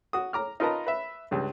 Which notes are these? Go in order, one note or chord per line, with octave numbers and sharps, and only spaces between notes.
F#4 D#6
A#5 D6 F6
D#4 F4 A#4 B4 A5 A#5
B4 E5
C#2 G2